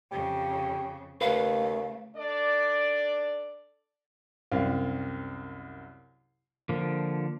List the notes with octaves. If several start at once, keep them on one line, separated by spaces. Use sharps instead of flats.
F2 C#3 G4
D#2 C#3 A3 B4 F5
D4 A4 D5
C2 F#2 C4 F5
D3 F3 A#3